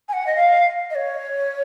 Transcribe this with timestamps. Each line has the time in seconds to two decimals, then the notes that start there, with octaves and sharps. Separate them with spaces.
0.08 G#5
0.12 F#5
0.26 D#5
0.35 F5
0.90 D#5
0.95 C#5